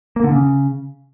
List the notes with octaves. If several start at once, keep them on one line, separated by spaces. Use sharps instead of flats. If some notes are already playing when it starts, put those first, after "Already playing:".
A#3
D3
C#3